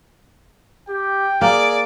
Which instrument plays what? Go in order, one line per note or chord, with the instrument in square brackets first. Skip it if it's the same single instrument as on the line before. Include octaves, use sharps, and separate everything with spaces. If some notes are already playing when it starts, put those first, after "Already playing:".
[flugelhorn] G4 [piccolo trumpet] G5
[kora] A#3 [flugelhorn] G#4 [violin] D5